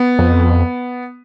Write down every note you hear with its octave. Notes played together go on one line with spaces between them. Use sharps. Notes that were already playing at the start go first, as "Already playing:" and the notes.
Already playing: B3
F2